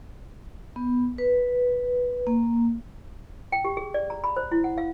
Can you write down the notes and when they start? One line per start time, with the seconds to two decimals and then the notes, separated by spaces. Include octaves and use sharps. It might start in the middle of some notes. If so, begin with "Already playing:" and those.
0.76 B3
1.18 B4
2.27 A#3
3.52 G5
3.65 G4
3.77 G#4
3.94 D5
4.10 A#5
4.24 B5
4.37 C5
4.51 E4
4.64 F#5
4.78 F5